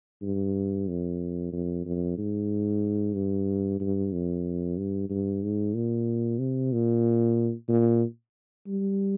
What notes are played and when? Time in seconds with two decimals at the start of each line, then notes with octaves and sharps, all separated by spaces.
0.22 G2
0.88 F2
1.52 F2
1.85 F2
2.18 G#2
3.14 G2
3.80 G2
4.13 F2
4.77 G2
5.09 G2
5.42 G#2
5.74 A#2
6.39 C3
6.72 A#2
7.69 A#2
8.67 G3